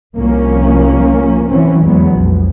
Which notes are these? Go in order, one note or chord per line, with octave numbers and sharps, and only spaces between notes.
C2 F3 A#3 C#4
E3 F#3 C4 C#4
E2 F#3 G#3 B3
B1 F2